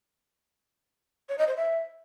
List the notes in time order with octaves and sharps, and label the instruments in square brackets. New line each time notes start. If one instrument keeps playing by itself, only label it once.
[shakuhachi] C#5
D#5
C5
E5